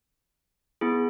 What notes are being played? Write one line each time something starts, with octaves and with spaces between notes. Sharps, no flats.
B3 E4 G#4